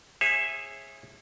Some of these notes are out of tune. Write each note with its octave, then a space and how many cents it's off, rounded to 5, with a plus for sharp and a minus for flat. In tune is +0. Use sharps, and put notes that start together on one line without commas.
G#4 -10 C#5 -35 E5 +0